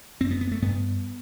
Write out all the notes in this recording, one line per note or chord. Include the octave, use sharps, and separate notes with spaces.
F#2 C4
B3
B3
A3
G2 B3